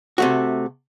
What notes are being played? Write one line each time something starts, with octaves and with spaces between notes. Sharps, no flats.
C3 A3 F#4